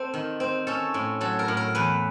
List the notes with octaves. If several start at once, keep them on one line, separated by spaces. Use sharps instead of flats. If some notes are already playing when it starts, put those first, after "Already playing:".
Already playing: C4 A4
D#3
C4
C#4 A4
A2
F#3 A4
A#4
A2
A#4
E2 B4